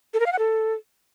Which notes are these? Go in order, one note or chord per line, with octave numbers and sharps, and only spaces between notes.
A4
A#4
F5
F#5
A4